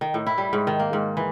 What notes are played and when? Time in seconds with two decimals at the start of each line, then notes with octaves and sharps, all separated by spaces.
0.01 D#3
0.14 A2
0.27 E4
0.38 G3
0.53 G#2
0.67 D#3
0.79 A#3
0.93 G#2
1.17 E3